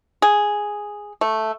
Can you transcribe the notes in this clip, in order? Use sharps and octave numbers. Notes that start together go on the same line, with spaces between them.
G#4
A3